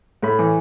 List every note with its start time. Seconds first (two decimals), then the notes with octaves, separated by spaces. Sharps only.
0.23 A2 B5
0.39 E3